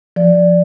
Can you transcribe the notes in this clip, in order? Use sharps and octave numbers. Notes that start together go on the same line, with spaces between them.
F3 D5